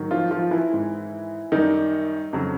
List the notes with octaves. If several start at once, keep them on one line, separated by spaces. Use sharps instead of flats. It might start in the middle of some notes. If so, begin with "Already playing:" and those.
Already playing: G#2 D#3 F#3
F3 F4
F3 F4
E3 E4
G#2 D#3 G#3
F#2 D#3 G3 D#4
F2 C#3 F#3